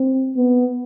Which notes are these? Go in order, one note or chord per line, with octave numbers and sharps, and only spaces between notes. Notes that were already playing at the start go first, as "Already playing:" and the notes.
Already playing: C4
B3